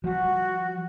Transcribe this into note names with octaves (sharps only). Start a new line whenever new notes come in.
F3 G3 F#4